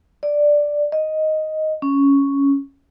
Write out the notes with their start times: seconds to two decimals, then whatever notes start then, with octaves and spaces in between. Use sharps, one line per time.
0.23 D5
0.92 D#5
1.82 C#4